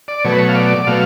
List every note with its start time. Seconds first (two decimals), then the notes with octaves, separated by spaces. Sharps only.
0.08 D5
0.24 B2 F#3 A3 C#5
0.32 B4
0.39 C#5
0.49 F5
0.55 D5
0.87 B2 F#3 A3 F5